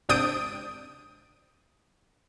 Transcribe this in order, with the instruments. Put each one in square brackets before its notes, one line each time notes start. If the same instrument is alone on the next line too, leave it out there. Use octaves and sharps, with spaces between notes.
[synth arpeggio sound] G#1 C3 D4 D#6 G6 D7